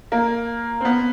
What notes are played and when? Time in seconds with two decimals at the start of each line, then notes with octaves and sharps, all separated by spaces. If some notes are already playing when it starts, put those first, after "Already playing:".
0.12 A#3
0.81 C4
0.85 B3